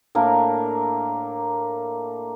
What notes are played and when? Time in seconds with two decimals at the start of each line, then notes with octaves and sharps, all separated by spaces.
0.15 A2 A#3 D4 A#4